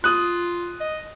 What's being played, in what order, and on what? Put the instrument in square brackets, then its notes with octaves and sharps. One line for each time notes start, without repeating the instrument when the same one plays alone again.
[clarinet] F4 [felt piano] D#6 F#6
[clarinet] D#5